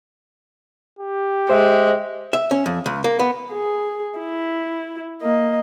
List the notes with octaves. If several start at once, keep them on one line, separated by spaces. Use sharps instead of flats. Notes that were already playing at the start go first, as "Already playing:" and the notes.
G4
G#3 C5 E5
E5
C#4
F2
C#2
A#3
B3
G#4
E4
A#3 D#5